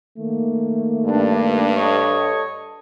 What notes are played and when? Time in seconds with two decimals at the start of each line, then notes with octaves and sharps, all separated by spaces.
0.19 D#3 A3 A#3
1.05 G2 D4
1.75 A4 C#5 D#5